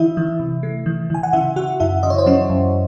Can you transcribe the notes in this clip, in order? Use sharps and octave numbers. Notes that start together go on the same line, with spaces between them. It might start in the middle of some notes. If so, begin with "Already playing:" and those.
Already playing: E3 E4 E5
E3
C3
A3
E3
E3 G#5
F#5
C#3 E4 E5
C#3 F#4 F#5
F#2 E4 E5
C#3 D#5
C#5
C5
F#3 C#4 C#5
F#2